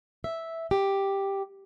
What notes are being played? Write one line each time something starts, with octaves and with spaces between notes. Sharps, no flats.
E5
G4